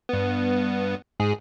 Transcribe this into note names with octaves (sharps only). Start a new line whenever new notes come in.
G2 B3
G#2 G#4